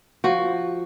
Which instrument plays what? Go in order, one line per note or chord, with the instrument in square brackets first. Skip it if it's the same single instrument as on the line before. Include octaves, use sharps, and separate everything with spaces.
[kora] F3 F#4